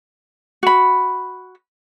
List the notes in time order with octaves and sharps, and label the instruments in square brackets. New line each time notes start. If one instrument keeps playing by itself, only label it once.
[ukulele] F#4 B5